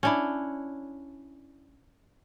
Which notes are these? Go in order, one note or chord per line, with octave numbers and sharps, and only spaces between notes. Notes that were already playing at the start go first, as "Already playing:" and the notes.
C#4 D4 E4